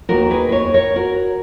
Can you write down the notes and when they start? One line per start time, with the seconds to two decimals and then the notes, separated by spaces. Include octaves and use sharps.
0.08 D#2 D#3 A#3 F#4 A#4
0.31 G#4 B4
0.49 B4
0.52 A#4 C#5
0.74 A#4 C#5
0.96 F#4 A#4